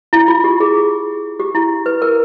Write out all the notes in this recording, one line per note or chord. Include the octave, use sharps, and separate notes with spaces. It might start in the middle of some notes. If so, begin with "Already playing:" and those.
E4
F4
G4
G#4
G4
E4
B4
A#4